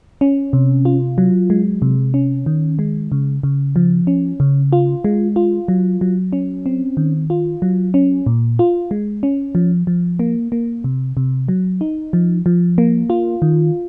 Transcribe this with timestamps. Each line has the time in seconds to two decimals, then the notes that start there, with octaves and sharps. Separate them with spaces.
0.21 C#4
0.53 C3
0.85 F4
1.18 F#3
1.50 G#3
1.82 C3
2.14 C#4
2.46 D#3
2.79 G#3
3.12 C#3
3.43 C#3
3.76 F3
4.07 C#4
4.40 C#3
4.73 F4
5.04 G#3
5.36 F4
5.68 F#3
6.01 F#3
6.33 C#4
6.66 C4
6.97 D#3
7.30 F4
7.62 F#3
7.94 C#4
8.26 A#2
8.59 F4
8.91 G#3
9.23 C#4
9.55 F3
9.87 F3
10.19 A#3
10.52 A#3
10.84 C3
11.17 C3
11.48 F#3
11.81 D#4
12.13 F3
12.46 F3
12.78 A#3
13.10 F4
13.42 D#3